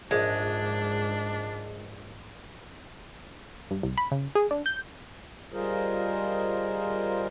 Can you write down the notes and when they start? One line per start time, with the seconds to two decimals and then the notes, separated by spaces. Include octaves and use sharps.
0.11 A#1 G#2 G#3 D4
3.71 G2
3.83 C2
3.98 B5
4.11 C#3
4.35 G#4
4.51 D4
4.66 G6
5.52 G3 F4 G#4 A#4 C5 D#5